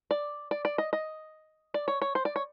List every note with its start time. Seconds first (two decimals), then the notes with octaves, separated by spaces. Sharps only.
0.11 D5
0.51 D5
0.65 D5
0.78 D#5
0.93 D#5
1.74 D5
1.88 C#5
2.02 C#5
2.15 C5
2.25 D5
2.36 C#5